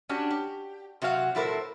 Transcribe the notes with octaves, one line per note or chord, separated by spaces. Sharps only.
C#4 D4 F#4 G4
G4
C3 F#3 F#4 F5 F#5
A#2 F#3 E4 A4 A#4 C5